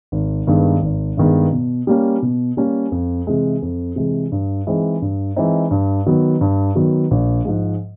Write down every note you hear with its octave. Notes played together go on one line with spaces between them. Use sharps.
G#1
G2 D#3 G#3 B3
G#1
G2 D#3 G#3 B3
B2
G3 A#3 C#4
B2
G3 A#3 C#4
F2
C3 E3 G#3
F2
C3 E3 G#3
G2
E3 G#3 C4 D#4
G2
E3 G#3 C4 D#4
G2
D#3 F#3 B3
G2
D#3 F#3 B3
A#1
G#2 F3 G#3